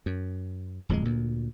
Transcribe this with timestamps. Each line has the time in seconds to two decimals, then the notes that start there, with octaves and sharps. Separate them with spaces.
0.06 F#2
0.89 D1 F2 G3 G#3
1.04 D2 A#2